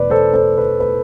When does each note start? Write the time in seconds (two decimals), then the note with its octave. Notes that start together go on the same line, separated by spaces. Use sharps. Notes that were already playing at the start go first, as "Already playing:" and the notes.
Already playing: E2 B2 B3 B4 D5
0.10 A4 C5
0.33 A4 C5
0.58 B4
0.80 B4